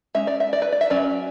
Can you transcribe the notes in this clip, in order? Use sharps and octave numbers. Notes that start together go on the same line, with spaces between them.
G#3 C#4 E5
D5
E5
D5
B4
D5
E5
F#3 C#4 D5